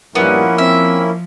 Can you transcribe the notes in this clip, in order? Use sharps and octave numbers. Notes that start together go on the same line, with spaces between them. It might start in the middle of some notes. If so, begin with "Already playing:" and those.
G2 A#2 F3 G3 A#3 B3 C#4 E4
C4 E5